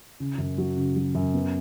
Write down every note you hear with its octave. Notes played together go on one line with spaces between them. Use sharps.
C#3
F#2
F#3
C#3
F#3
F#2
B3